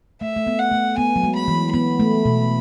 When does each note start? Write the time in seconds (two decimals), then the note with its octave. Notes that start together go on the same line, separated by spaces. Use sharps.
0.21 A3 E5
0.36 A3
0.47 B3
0.59 F#5
0.72 A3
0.98 B3 G#5
1.16 F#3
1.24 G#3
1.36 B5
1.48 E3
1.74 B3 B5
2.00 A3
2.25 B2